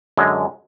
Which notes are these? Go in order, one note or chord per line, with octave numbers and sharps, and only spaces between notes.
F#2 D3 G#3